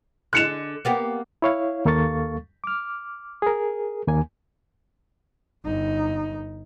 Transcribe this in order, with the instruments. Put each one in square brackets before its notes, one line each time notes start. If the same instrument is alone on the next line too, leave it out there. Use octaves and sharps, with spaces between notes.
[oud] D3 G#3 [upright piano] F#6 C#7 E7
[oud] A#3 B3 G4
[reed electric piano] E4 C#5 F5
D#2 A#3 A4 F5 C#6 A6
D6 F6
G#4 A#4
D#2 A#3 G#5
[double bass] G1 D#4